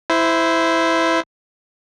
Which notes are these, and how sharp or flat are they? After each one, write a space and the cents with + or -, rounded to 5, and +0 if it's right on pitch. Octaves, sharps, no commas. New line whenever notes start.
E4 +0 C5 -15